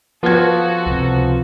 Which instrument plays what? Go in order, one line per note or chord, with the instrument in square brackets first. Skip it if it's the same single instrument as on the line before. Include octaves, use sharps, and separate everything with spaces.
[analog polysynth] F3 [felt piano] B3 G#6 [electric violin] F#4 A4
[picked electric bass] C#2 C3